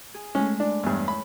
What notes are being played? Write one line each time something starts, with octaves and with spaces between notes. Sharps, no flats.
G#4
G#3 A3 C#4
D4
E2 G2 C#4 F#6
B5